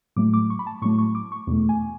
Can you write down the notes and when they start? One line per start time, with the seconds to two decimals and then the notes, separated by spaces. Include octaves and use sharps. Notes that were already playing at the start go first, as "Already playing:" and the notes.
0.16 A2 F#3 A3 D6
0.34 D6
0.50 C#6
0.59 B5
0.67 A5
0.82 A2 F#3 A3 C#6
0.99 C#6
1.15 D6
1.32 C#6
1.47 E2 B2 A3
1.69 G#5